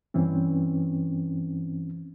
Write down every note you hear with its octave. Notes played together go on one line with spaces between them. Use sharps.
G2 E3 C4 C#4